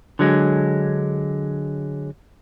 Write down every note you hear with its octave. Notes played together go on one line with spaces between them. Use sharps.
D3 F#3 G#3